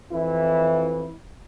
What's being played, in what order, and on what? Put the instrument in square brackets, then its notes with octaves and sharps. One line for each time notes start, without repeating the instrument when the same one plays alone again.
[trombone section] F2 E3 E4